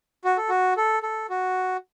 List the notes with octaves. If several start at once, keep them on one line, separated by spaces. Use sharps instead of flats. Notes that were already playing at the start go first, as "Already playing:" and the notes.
F#4
A4
F#4
A4
A4
F#4